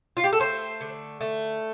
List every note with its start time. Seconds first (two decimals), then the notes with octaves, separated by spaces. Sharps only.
0.17 F4
0.24 G4
0.33 A4
0.40 A3 C5
0.81 D3
1.21 A3